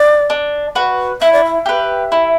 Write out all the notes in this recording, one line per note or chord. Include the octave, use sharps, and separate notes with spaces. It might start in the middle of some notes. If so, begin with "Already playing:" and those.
Already playing: D5
D4
F#4 B4
E4 E5
D5
E5
G4 B4
E4